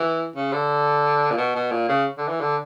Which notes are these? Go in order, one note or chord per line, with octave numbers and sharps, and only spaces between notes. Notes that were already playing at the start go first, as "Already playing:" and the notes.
Already playing: E3
C#3
D3
A#2
B2
B2
A#2
C#3
D3
E3
D3